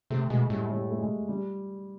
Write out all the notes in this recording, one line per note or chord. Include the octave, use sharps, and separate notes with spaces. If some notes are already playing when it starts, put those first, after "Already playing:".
C3 A3
B2 G#3
A2 G3
G3
A3
G#3
G3